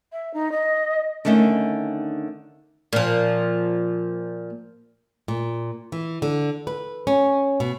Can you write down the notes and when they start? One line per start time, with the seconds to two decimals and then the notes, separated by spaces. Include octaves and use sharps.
0.12 E5
0.33 D#4
0.51 D#5
1.25 D3 D#3 A3 C#4 D#4
2.93 A#2 F3
5.28 A#2
5.92 E3
6.22 D3
6.67 B4
7.07 C#4
7.60 B2